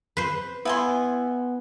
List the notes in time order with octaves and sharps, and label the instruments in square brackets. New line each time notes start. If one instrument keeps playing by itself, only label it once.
[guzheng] B4 C5
[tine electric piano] B3 [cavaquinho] E4 G#5 C6